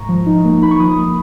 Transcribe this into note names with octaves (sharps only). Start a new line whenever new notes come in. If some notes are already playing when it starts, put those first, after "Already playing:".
Already playing: G#2 A#5 C#6
F3
D#4
A#3
D#4 B5
C#6
F3 B5 D#6
A#3